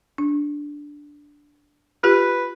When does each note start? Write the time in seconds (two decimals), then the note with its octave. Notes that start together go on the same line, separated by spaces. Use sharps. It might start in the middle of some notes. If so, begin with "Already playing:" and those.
0.18 D4
2.04 F4 G4 B4